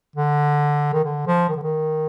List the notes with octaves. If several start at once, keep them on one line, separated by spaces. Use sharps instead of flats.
D3
D#3
D3
F3
D#3
D3
D#3